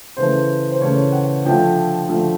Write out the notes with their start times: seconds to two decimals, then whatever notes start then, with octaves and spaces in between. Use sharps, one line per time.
0.17 C#3 E3 A3 C5
0.71 C5
0.81 C#3 E3 A3 C#5
1.12 F#5
1.45 D3 F3 A3 G5
2.08 D3 F3 A3